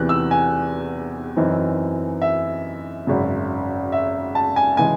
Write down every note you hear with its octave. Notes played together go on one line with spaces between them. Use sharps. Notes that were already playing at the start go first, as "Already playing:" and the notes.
Already playing: E2 C3 E3 F#6
E6
G#5
F#2 E3 C4 D#4
E5
G#1 F#2 C#3
E5
A5
G#5
C#3 E3 G#3 G#5